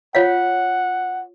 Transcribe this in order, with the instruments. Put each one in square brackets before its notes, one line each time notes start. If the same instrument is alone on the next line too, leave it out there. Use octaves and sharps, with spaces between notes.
[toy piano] F4 C#5 F5 [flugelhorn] F#5